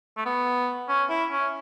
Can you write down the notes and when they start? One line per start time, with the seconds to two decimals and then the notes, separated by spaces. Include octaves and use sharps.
0.17 A3
0.25 B3
0.89 C#4
1.09 E4
1.31 C#4